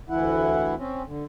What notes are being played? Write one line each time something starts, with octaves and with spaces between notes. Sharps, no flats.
D2 E3 E4 F#5
C4 C#4
D3